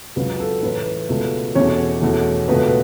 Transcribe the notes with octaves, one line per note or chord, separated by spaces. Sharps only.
C#2 C#3 F#3 B4
A4
A2 E3 A3 B4
C#2 B2 A3
E2 B2 A3 C#4 C#5
E2 B2 A3
C#2 B2 A3 B4